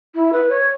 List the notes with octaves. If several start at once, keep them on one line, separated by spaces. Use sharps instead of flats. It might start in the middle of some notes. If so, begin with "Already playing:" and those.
E4
B4
C#5